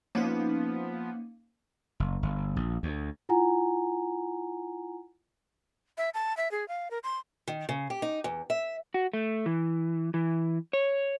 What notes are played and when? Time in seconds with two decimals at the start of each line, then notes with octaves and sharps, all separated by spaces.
0.15 F3 A#3 B3 C#4 D#4
2.00 F#1
2.23 G1
2.56 A#1
2.83 D2
3.29 E4 F4 F#5 G#5 A#5
5.98 E5
6.14 A5
6.37 E5
6.51 G#4
6.68 F5
6.91 A#4
7.04 C6
7.48 D#3
7.69 C#3
7.90 G4
8.02 D#4
8.24 E2
8.50 E5
8.94 F#4
9.13 A3
9.46 E3
10.14 E3
10.73 C#5